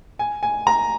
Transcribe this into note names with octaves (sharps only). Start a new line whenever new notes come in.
G#5
G#5
A#5